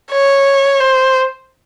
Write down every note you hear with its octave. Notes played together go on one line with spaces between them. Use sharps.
C#5
C5